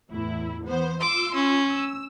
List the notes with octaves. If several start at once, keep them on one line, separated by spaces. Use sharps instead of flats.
E2 A2 E4
E3 B3 C5
F4 C6 D6 E6
C#4
E6